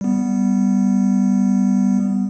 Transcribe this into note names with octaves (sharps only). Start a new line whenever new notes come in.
G3 B3